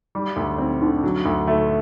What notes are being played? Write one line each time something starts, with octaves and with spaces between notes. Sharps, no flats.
G3
D2
C4
D3
F#3
D2
A3